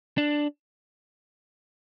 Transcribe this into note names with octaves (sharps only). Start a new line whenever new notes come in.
D4